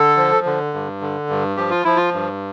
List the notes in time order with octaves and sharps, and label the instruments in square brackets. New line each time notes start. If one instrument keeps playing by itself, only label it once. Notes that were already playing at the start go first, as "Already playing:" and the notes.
Already playing: [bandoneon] D3 A4
F3
D3
G2
D3
G2
F3 G4
F4
F3 E4
F4
G2